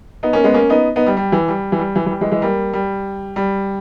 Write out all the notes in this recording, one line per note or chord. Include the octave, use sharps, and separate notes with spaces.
B3 D#4
A#3 C#4
G#3 B3
A#3 C#4
B3 D#4
B3 D#4
G3
G3
E3
G3
E3
G3
E3
E3
G3
E3 G#3
E3 G#3
G3 A#3
G3
G3